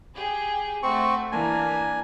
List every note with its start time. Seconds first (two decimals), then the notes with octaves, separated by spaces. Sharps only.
0.15 G4 G#4
0.83 A3 C4 F#4 C#6
1.32 E3 A#3 D4 G#5